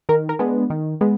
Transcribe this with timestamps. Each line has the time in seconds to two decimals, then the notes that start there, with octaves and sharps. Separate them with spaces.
0.09 D#3 A#4
0.29 A#4
0.39 G#3 B3 D4
0.70 D#3
1.01 G#3 B3